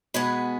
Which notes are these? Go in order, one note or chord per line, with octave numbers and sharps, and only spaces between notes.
B2 G#3 B3 G#4 B4